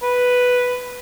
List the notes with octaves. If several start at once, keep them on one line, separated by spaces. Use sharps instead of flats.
B4